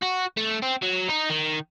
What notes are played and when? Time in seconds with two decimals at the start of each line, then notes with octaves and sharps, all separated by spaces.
0.02 F#4
0.37 A3
0.62 C4
0.82 F#3
1.08 D#4
1.29 D#3